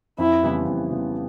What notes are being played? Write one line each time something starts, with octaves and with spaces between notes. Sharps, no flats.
F2 E4
C#3 E3 G3 B3
F2
C#3 E3 G3 B3